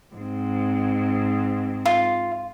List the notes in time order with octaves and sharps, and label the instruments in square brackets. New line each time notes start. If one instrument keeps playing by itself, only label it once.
[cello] G#2 C4
[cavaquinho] F4